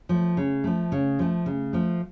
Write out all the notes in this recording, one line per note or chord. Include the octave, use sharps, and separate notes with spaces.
F3 A3
C#3
F3 A3
C#3
F3 A3
C#3
F3 A3